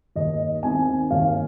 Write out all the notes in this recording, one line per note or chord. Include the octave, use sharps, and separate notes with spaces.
D#2 D#5
D#3 C4 G#5
D#2 F5